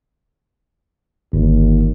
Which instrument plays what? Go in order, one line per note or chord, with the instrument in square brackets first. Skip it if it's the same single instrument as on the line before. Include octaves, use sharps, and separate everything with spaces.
[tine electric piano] G1 [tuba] D#2